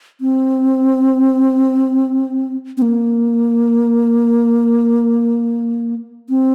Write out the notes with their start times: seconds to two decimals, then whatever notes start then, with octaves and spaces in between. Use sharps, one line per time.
0.21 C4
2.77 C4
2.82 A#3
6.30 C4